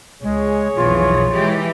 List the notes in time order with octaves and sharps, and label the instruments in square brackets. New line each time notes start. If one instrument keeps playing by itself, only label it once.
[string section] C#2 [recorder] G#3 [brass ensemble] G#4 C#5
[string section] B1 F2 E3 [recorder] F4
[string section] E3 G#3 G4